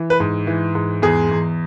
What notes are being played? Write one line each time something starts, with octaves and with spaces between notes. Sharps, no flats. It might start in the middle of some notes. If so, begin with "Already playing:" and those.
Already playing: E3
B4
G#2
E3
G#2
E2 G#4
E2